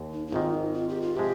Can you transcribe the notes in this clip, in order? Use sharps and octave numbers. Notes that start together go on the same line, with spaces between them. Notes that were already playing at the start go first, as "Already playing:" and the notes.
Already playing: D#2
D#4
D#4
G#1 G#2 D#3 F4
D#4
F4
G4
F4
C3 F3 G#3 G4